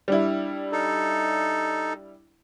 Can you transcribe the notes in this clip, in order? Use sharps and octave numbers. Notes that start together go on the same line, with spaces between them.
G3 D4 E4
D#4 A4